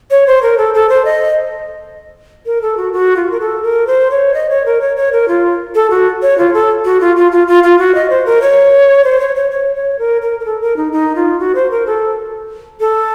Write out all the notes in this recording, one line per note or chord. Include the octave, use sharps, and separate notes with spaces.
C#5
C5
A#4
A4
A4
C5
D#5
A#4
A4
F#4
F#4
F4
A#4
A4
A#4
C5
C#5
D#5
C#5
A#4
C#5
C#5
A#4
F4
A4
F#4
C#5
F4
A4
F#4
F4
F4
F4
F4
F4
F#4
D#5
C5
A#4
C#5
C5
C#5
C#5
C#5
C#5
A#4
A#4
A#4
A4
A#4
D#4
D#4
F4
F#4
C5
A#4
A4
A4